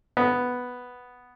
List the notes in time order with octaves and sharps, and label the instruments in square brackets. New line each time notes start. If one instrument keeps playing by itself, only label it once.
[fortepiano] B3